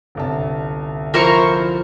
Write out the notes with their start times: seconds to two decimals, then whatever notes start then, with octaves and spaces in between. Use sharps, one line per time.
0.15 G1 C2 A5
1.14 F3 E4 A#4 C5 C#6